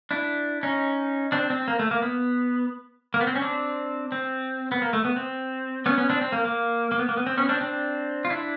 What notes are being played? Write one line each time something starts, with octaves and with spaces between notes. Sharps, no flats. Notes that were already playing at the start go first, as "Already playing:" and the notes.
D4 E4
C#4 D#4
C4 D4
C4
A#3
A3
A#3
B3
A#3
B3
C4
C#4
C4 D4
C4
B3
A#3
A3
B3
C4
B3 C#4
B3 C#4
C4 D4
C4
A#3
A#3
A#3
B3
A#3
B3
C4
B3 C#4
C4 D4
C4 D4
F4
D4 E4